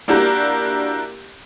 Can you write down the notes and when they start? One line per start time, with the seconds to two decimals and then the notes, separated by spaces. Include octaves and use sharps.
0.08 A#3 D4 E4 F#4 G4 A#4